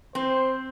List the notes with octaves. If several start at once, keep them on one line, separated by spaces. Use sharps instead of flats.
C4 C5